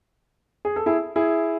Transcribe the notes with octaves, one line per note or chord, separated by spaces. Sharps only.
G#4
A4
E4 G#4
E4 G#4